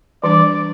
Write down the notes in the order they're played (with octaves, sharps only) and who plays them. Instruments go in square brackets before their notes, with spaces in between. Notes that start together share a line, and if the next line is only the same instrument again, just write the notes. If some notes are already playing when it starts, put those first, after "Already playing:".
[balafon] E3 G3 D4 [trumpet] D5